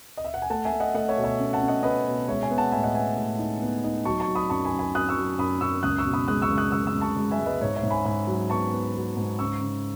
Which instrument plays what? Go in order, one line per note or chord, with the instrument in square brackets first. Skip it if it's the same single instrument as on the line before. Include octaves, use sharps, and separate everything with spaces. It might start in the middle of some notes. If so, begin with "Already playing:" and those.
[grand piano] D#5
E5
F#5
G#5
A3 F#5 A5
E5 G#5
A3
D#5 F#5
A3 D#5 F#5
C#5 E5
B2
C#5 E5
C#4
F#5 A5
C#4
D#5 F#5
C#4 B4 D#5
B2
G#3 C#5 E5
E5 G#5
B3
F#5 A5
A2 E5 G#5
D#5 F#5
B3 E5 G#5
A2
D#4
B3
D#4
F#3 A5 C#6
A5 C#6
F#3
B5 D#6
F#2 A5 C#6
G#5 B5
F#2
G#5 B5
F#3 D#6 F#6
C#6 E6
F#3
F#2 B5 D#6
F#2 C#6 E6
C#2 D#6 F#6
C#6 E6
B2
B5 D#6
G#3 D#6 F#6
C#6 E6
C#2
D#6 F#6
G#3 C#6 E6
C#6 E6
C#2
A5 C#6
G#3
E5 G#5
G#3
B4 D#5
G#2 C#5
C#5 E5
G#2
G#5 B5
G#2 G#5 B5
F#3
B3 A5 C#6
B3
F#3
G#2
C#3 C#6 E6
C#3